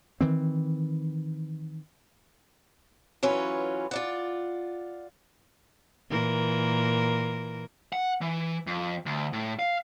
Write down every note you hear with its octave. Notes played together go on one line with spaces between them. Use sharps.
D#3 E3 C4
E3 F#3 C#4 F4 B4
F4 D5 F#5
A#2 E3 A#4
F#5
E3
F2
D2
A2
F5